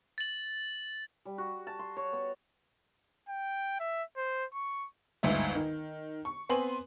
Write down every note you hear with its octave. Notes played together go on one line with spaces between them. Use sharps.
A6 F#7
G3
F#4
A5
C6
C#5
B3
G5
E5
C5
C#6
G1 D2 G#2 E5
D#3
C#6
B3 C4 B4 G#5 C6 F#7